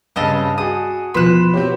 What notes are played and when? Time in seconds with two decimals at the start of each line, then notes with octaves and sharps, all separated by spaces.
0.16 G2 C#3 C4 D#5 A5
0.58 F#4 G#4 D#6
1.14 E2 B2 F3 B4 C6 F#6 E7
1.54 C4 F#4 G4 C#5